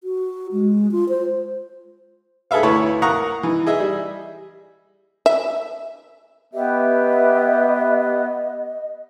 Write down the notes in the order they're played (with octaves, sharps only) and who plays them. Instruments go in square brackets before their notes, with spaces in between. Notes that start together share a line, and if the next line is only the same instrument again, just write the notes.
[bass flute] F#4
G#3
F4
C5
[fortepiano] G#4 A4 B4 E5 F5
D2 E4 B4 C#5 A5
A#4 F5 F#5 A#5 C#6 D#6
E3 D#4
G#4 D#5 E5
G3
[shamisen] E5
[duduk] B3 [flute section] G4 B4 E5 [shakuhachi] D#5